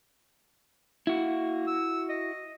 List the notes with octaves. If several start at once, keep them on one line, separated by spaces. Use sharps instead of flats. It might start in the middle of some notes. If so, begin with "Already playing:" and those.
A#3 E4 F#4
E6
D#5